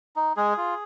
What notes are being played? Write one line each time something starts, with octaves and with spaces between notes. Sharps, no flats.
D#4
G#3 G#4
F4